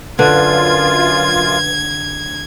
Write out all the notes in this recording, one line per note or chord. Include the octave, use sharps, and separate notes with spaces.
F#2 D3 F4 B4 G#6